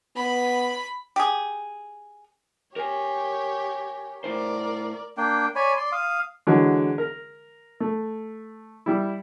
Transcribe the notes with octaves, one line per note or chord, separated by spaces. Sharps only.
B3 B5
G4 G#4
G4 A#4 C#5 G#5
A2 E4 A#4 C5 D5
A#3 D4 G5
C#5 D5 G#5 B5
D5 C6
F5 D#6
D3 E3 F#3 G#3
A#4
A3
G3 E4